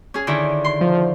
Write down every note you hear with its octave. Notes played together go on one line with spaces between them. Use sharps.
C#4 G#4
D3 D#3 E4
C6
F3